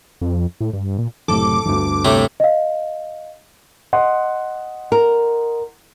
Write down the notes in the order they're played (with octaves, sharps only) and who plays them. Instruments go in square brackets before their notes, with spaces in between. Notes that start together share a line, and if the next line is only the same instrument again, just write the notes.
[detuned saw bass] F2
A2
G2
A#2
[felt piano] F#1 A2 C3 [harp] A4 [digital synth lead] D6
[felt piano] G1 D2
[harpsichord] A2 A3 [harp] C3
[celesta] D#5 F5
[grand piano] D#5 F#5 C6
[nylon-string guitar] A#4